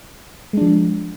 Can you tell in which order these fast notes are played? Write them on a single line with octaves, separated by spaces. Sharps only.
G#3 D4 F3